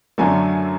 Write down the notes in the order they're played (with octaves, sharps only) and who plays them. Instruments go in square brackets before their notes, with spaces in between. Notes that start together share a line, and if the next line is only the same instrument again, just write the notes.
[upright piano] F#2 D3 F#3 A3 G#5